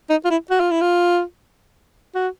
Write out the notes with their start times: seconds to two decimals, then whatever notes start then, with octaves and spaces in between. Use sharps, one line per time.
0.10 D#4
0.25 F4
0.30 E4
0.51 F#4
0.60 F4
0.71 E4
0.81 F4
2.15 F#4